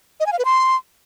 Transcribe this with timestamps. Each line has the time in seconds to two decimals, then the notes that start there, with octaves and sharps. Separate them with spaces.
0.20 D#5
0.26 G#5
0.33 F5
0.39 B4
0.45 C6